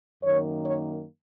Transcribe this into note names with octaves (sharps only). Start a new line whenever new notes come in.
F#2 D#3 A#3 C#5
C#5